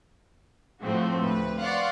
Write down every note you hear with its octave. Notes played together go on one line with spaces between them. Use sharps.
A2 F3 A3 C4 F#4
D2 B4
D5 F5 F#5 C6 C#6